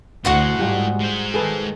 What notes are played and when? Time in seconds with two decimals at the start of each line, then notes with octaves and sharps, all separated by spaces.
0.25 D2 A2 F#4 F#5 C6
0.59 G#2 G3 F4 G4
1.00 G#3 C5
1.34 D#3 G#4 A4 B4